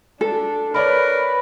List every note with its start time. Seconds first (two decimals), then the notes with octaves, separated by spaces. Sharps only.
0.21 D4 A4
0.74 A#4 B4 C#5 D5 B5